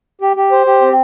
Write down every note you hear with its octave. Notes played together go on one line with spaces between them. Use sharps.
G4
G4
C5
G4
C4